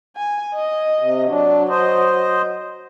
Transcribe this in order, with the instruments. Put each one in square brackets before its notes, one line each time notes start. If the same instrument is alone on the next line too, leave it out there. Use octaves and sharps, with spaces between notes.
[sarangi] G#5
D#5
[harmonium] C3
[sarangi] F#3 [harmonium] D4
[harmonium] C5 D#5